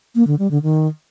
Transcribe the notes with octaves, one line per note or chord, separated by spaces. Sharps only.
A#3
D3
G3
D3
D#3